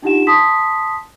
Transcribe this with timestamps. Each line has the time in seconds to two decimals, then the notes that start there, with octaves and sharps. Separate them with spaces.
0.02 D4 D#4 F4 G4 F#5 E7
0.27 A5 C6 D#6 B6